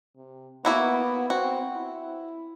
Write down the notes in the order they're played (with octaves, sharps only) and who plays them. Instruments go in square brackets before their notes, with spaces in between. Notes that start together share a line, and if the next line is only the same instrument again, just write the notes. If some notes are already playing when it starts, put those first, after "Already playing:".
[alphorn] C3
[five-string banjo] A#3 E4 F#4 [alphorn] B3
[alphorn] C4 [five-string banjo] F#4
[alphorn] E4